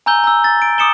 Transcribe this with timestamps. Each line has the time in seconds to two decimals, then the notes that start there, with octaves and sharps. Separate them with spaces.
0.06 G#5 A#5 E6 G6 G7
0.23 A#5 E6
0.44 A6
0.62 D7
0.78 D6 D#6 C#7 E7 G7